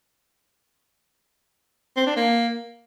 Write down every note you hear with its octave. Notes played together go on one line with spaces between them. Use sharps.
C4
D4
A#3